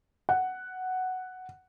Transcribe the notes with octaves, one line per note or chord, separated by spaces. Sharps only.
F#5